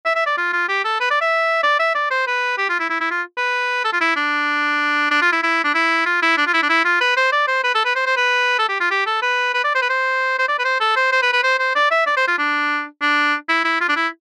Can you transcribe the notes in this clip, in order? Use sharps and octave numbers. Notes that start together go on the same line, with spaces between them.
E5
E5
D5
F4
F4
G4
A4
B4
D5
E5
D5
E5
D5
C5
B4
G4
F4
E4
E4
E4
F4
B4
A4
F4
E4
D4
D4
F4
E4
E4
D4
E4
F4
E4
D4
F4
E4
D4
E4
F4
B4
C5
D5
C5
B4
A4
B4
C5
C5
B4
A4
G4
F4
G4
A4
B4
B4
D5
C5
B4
C5
C5
D5
B4
C5
A4
C5
C5
B4
B4
C5
C5
D5
E5
D5
C5
F4
D4
D4
E4
E4
F4
D4
E4